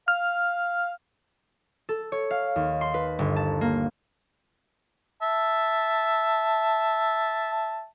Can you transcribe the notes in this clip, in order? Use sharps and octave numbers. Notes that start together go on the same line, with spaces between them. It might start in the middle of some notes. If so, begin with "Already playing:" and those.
F5 F6
A4
C#5
F5
D#2
C6
B4
G1
A5
A#3
E5 A5